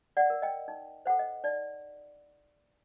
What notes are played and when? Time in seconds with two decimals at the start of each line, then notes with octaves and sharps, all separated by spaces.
0.17 D5 F#5
0.30 A#4
0.42 D#5 G5
0.68 D#4
1.05 A4 C5 F#5
1.19 D#5
1.44 D#4 D5